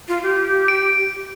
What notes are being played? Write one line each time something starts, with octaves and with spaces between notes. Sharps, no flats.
F4
G4
D7